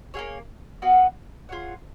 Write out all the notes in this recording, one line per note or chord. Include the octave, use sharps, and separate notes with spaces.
A#3 F4 G#4 C#5
B3 F#4 B4 F5
F4 G#4 C#5 F#5